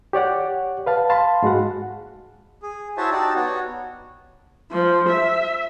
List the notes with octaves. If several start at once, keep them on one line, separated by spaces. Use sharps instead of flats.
G4 C#5 D5 F#5
B4 F5 A5
F5 A5 B5 C6
G#2 G#3 F#4 F#5
G#4
E4 F#4 C5 C#5 E5 A5
D#4 F#4 G4 D5 A5
B3 F#4 C#5
F3
E5